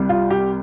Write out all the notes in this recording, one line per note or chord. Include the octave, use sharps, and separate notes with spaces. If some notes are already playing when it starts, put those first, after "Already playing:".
Already playing: C2 C3 G3
F4
G4